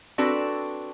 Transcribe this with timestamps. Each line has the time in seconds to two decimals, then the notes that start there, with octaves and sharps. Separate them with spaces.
0.18 C4 D4 F#4 A4 B4